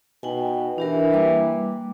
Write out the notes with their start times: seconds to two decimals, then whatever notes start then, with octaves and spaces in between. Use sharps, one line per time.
0.23 B2 D#4 G5 G#5
0.78 E3 D4 G4 A#4
1.12 G3 A#3 D6